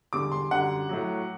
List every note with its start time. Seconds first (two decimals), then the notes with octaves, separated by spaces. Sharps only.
0.13 E2 D3 G3 D6
0.32 C6
0.51 F#2 D3 G3 F#5
0.89 A2 F#3